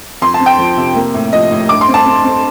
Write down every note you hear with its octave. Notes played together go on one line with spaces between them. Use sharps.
F2 C6
A5
C4
G5
F3
C3
A#3
A2
F3 D#5
A2
G2 D6
C6
C4
A5
C4
C4